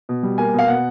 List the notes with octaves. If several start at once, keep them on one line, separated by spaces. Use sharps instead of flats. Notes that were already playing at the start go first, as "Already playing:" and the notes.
B2
G3
A#3 G#5
B2 F5
B2 F#5